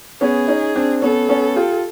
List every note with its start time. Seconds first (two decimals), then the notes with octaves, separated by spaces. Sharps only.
0.21 B3 C#4 G#4
0.48 C#4 D#4
0.75 C4 D4
1.02 B3 C#4 A4
1.29 B3 C#4
1.56 F4 G4